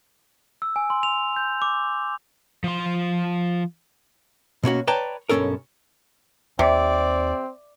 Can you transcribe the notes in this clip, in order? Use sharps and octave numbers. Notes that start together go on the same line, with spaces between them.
E6
G#5
C6
F7
G6
D6
F3 C6
B2 A#3 C#4 F#4
B4 C#5 D5 G5 A5 A#5
B1 G2 C#3 C#4 A4 A#4
D#2 C3 C4 D5